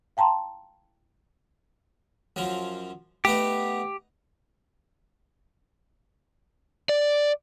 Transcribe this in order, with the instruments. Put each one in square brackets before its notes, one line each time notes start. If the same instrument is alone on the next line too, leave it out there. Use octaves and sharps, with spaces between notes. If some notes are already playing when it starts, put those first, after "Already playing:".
[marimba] F5 G5 A5 A#5 C6
[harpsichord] F#2 F3
[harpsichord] A3 B3 D#4 [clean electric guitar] G4
[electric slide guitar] D5